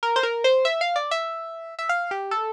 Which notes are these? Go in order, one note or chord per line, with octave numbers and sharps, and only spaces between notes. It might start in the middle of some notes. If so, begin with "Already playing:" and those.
A#4
C5
A#4
C5
E5
F5
D5
E5
E5
F5
G4
A4